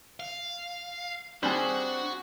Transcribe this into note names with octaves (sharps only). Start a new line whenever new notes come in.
F5
G3 C4 D4 F#4 G#4 C5